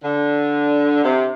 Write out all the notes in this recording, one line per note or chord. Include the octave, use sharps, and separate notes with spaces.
D3
C3